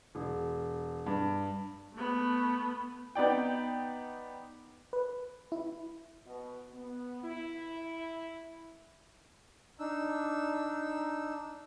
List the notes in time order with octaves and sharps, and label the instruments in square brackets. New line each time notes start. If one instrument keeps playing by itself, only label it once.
[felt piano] E1
G2
[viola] A3 B3
[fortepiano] B3 D#4 D5 G5
[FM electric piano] B4
E4
[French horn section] B2
B3
E4
[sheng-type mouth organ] D4 D#4 E6